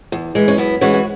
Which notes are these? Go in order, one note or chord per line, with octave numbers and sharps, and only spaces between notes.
E2
E3 G#3
C#4
F#2 B3 E4
E3 G#3 C#4 F#4
F#4